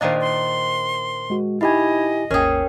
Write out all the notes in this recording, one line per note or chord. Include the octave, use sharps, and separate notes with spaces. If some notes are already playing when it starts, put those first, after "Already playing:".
A#2 D#3 D4 C5 D#5 F5
C6
G#3 F#4
D#4 E4 G4 D#5 G#5 B5 G#6
G#1 D#2 C#4 G#4 A#4 G5